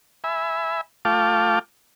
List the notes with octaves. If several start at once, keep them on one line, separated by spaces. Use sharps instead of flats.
E5 G#5 B5
A3 F4 F5 G5 A5 D6